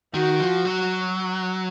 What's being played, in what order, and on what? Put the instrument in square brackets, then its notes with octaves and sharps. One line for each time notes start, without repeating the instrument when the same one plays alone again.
[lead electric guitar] D#3 [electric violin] F#4
[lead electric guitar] F3
F#3